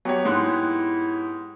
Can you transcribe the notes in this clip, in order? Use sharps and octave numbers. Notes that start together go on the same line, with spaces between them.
F#3 B3 G4 C#5
G#2 E4 C6 F#6